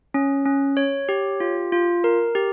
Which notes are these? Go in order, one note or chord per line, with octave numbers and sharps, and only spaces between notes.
C#4
C#4
C#5
G4
F4
F4
A#4
G4